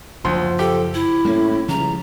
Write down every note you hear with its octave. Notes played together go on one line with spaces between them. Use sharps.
F#1 D2 F3 C6
G4 A4
E4
A2 G3 A#3 C#4
C#2 C#3 F3 G3 A#5